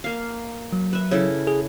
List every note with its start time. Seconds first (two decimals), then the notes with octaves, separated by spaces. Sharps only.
0.04 A#3 F5
0.73 F#3
0.93 B4 E5
1.11 C#3 E4 A4
1.47 G#4